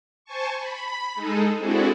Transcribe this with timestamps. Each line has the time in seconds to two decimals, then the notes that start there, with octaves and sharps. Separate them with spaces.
0.25 C5 G#5 A5 C#6
0.58 B5
1.15 G#3 D#4 G#4 A4
1.58 C4 D4 E4 F#4 G#4 A4